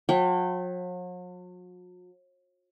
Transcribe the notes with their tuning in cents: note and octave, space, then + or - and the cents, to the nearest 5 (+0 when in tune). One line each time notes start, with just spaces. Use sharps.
F#3 -45 G5 -30